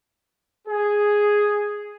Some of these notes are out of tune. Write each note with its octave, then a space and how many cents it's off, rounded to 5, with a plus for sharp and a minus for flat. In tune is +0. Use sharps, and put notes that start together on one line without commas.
G#4 +0